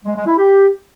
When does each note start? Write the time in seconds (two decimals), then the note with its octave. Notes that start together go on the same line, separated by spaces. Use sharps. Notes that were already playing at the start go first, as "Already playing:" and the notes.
0.05 G#3
0.16 G#3
0.26 E4
0.37 G4